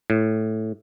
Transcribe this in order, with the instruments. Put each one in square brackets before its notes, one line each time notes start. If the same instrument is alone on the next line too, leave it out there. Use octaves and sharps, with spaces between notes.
[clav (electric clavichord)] A2